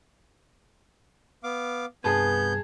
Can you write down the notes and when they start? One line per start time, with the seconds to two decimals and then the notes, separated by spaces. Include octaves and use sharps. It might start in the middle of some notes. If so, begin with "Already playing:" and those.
1.44 B3 F5 D6
2.04 C2 G2 B3 G#4 B4 A5 G6 G#6